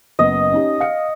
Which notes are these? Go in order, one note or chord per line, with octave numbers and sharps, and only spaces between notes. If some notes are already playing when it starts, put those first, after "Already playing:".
F#1 B3 D#5
C#4 D#4 G4
F5 C#7